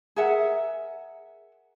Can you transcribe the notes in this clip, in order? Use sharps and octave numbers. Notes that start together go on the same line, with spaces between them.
G#4 A#4 E5 F#5